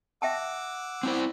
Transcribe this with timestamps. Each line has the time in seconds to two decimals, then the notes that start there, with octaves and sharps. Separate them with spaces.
0.22 E5 F#5 G5 A5 D6 E6
1.03 C4 E4 C5